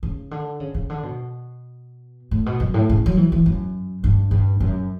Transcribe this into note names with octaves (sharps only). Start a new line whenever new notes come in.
C#3
D3
C#3
C#3
D3
B2
A2
B2
F#2
A2
C#3
F#3
E3
E3
F#2
G2
G2
F#2